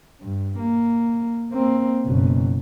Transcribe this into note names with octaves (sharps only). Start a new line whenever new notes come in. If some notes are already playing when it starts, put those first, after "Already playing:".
G2
A#3
A#3 C4
F#1 B2